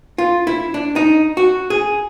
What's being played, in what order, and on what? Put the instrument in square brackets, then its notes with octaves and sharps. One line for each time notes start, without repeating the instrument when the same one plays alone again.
[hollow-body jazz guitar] F4
E4
D4
D#4
F#4
G#4